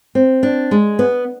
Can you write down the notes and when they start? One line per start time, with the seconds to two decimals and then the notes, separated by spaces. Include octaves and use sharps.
0.15 C4
0.43 D4
0.71 G#3
0.99 B3